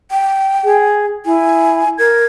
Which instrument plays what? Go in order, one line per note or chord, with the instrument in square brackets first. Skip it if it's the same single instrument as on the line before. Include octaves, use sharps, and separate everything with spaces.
[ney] G5
[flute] G#4
[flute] E4 [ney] G#5
[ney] A#4 [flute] G#6